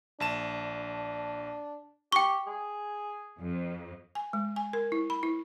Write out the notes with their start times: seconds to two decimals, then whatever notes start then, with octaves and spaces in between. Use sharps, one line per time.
0.20 A#1 D4 A5 E7
2.12 G4 G5 C#6
2.47 G#4
3.40 F2
4.15 G#5
4.33 G#3
4.56 G#5
4.73 A#4
4.92 E4
5.10 B5
5.23 E4